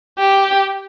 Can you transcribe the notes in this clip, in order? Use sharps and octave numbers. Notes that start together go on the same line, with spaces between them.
G4